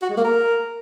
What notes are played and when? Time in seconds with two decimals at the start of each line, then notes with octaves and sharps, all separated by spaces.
0.02 F#4
0.10 G#3
0.17 A#3
0.25 A#4